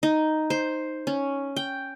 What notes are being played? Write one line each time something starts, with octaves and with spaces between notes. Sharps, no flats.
D#4
C5
C#4
G5